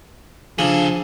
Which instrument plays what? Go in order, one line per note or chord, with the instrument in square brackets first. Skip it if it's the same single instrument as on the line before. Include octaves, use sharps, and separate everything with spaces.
[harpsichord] C#3 [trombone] F3 [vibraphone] D4 [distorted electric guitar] G#4 A4